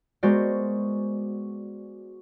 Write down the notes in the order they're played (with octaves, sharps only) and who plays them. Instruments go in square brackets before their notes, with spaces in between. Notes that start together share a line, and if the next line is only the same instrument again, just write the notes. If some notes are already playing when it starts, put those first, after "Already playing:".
[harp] G#3 B3 F#4 A#4 C5 D5